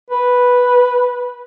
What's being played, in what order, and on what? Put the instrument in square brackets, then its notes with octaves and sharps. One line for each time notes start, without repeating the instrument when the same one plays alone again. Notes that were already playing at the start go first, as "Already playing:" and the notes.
[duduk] B4